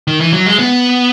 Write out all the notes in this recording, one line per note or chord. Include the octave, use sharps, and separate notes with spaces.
D#3
E3
F#3
G#3
B3